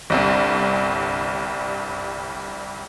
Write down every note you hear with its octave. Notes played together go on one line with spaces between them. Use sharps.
G1 C2 G2